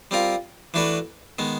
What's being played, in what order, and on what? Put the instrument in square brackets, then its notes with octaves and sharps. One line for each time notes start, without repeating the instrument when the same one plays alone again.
[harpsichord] G3 C4 F4 A#4
E3 A3 D4 F#4 B4
D#3 G#3 B3